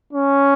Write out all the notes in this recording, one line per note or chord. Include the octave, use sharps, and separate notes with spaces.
C#4